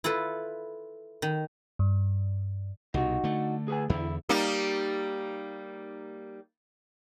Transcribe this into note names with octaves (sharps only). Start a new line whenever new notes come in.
E4 F4 A4 B4
D#3
G2
C2 B2 D#4 F#4
D3 A3
G#4 B4 G#5
E2 D3 E4
G3 A#3 D#4